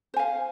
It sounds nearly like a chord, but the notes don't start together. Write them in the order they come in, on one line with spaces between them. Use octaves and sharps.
C5 G#5 F5